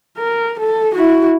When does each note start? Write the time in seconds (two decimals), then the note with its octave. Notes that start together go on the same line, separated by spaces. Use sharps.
0.18 A#4
0.60 A4
0.95 E4 F#4